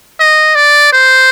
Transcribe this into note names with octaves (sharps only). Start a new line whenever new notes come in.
D#5
D5
C5